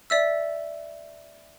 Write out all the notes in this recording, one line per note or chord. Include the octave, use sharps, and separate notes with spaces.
D5 E5 E6